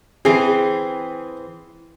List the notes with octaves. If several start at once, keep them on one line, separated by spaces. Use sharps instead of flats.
E3 C4 G#4